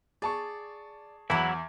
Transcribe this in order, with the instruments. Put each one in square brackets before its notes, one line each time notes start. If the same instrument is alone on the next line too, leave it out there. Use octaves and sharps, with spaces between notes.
[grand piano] G#4 A5 C#6 [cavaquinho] D5
[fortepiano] E2 [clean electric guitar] F#3 E4 [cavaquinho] F#5 B5 D6